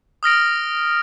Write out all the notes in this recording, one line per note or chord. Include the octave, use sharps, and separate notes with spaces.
D#6 F6 A#6 D7